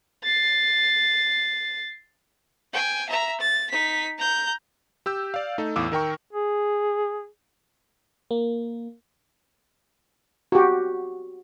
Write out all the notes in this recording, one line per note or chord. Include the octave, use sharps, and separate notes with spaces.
A6 C7
G5 G#5
E5 A#5
A6
D#4 B6
A#5 G6
G4 E6 G6
D5 F5
A3 D#4 A4
E2 A2 F5 D6 E6
D#3 A#4 G5 C#6
G#4
A#3
F#4 G4